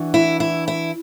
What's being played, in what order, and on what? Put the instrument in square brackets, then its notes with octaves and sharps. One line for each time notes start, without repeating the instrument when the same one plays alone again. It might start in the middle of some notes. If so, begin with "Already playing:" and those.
Already playing: [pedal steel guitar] E3 D4 F#4
[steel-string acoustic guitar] E4
E4
E4